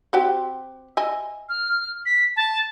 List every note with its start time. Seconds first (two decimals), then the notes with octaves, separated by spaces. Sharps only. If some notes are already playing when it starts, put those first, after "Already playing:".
0.13 C4 F#4 G4
0.97 D#5 E5 G#5
1.49 F6
2.06 B6
2.36 A5